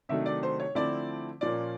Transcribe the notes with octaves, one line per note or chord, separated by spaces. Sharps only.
C3 D#3 F#3 A3 D4 E5
D5
C5
C#5
D3 F3 A3 C4 E4 D5
A#2 F3 A#3 C#4 D5